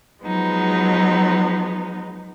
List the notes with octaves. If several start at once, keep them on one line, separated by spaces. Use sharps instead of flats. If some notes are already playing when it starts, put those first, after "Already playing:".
F3 F#3 G#3 B3 D#4